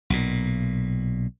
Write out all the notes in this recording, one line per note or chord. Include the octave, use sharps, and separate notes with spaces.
B1 A#2